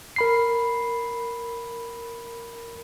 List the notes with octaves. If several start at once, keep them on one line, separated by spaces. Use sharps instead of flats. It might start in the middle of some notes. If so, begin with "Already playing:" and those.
A#4 B5 C7